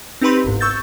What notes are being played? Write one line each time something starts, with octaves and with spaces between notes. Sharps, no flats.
C4 D#4 G4 B4 B5 C6
G1 C2 G#2
C#6 E6 G6 A6